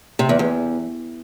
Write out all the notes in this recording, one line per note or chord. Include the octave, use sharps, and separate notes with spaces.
C3
E2
E2